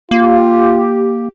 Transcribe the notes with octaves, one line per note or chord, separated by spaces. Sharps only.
A#3 F4 G4